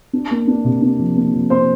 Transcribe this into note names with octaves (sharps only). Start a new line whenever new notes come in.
D4
A#3
D4
C3
D4
F3
A#3
F3
A#3 C5 C6